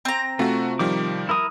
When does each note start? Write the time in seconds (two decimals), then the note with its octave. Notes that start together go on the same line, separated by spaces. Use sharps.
0.05 C4 A#5
0.39 C3 A3 F4 F#4
0.79 D#3 F3 G3 D6
1.29 E4 A#4 D#6